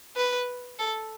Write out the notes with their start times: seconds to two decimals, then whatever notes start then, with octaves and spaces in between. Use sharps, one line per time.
0.16 B4
0.79 A4